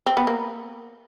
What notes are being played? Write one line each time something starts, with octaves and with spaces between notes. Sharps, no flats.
C4
B3
A#3